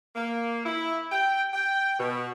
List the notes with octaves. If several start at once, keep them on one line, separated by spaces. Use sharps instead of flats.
A#3
E4
G5
G5
B2